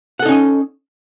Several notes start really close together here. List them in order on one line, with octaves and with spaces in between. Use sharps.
F#5 A4 D#4 C#4 D#5